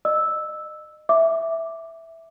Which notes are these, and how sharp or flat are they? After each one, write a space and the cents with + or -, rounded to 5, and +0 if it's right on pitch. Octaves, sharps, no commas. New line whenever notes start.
D#5 -30 E6 -5
E5 -5 D6 +0